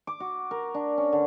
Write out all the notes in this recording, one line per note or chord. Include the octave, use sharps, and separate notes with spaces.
D6
F#4
A#4
D4
C#4
D3